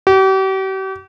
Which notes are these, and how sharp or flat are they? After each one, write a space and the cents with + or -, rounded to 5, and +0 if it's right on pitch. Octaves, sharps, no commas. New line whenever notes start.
G4 -40